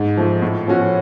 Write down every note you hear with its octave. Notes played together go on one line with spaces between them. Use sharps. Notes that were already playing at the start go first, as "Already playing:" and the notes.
Already playing: G#2
F3 A3
A2
F3 A3 C#4 F#4